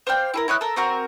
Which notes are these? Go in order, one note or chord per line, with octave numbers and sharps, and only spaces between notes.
C5 D5 F5 G5
E4 G#4 A#4
E4 C#5 D#6 F#6
A4 A#4
C4 F#4 A#4